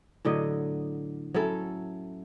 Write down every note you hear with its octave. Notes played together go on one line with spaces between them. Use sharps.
A2 D3 F#3 D#5
F#3 C#4 E4 A4